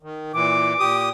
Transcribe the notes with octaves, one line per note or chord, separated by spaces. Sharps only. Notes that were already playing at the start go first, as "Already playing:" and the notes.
D#3
A#2 E3 D6
A#2 G4 D#6